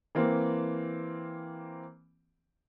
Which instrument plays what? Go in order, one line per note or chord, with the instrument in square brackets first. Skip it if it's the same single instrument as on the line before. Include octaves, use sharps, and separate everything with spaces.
[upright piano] E3 A#3 C4